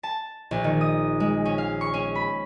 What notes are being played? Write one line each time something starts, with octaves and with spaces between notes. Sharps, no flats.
A5
A#1
D#3
D#6
G#3
C#4
F5
C#6
C#4
B5